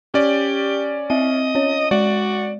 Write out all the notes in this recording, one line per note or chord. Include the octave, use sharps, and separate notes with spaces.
C#4 G4 D5
C4 D#5 E5
C#4 C#5
G#3 F#4 D5